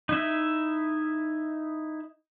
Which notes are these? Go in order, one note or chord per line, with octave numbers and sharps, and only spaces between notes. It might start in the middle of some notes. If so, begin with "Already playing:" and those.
D#4 E4 E5